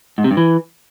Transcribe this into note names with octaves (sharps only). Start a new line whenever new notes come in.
G#2
C3
G2
E3